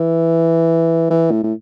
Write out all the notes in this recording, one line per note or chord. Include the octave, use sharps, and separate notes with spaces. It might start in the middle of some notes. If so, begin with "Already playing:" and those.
Already playing: E3
E3
A2
A2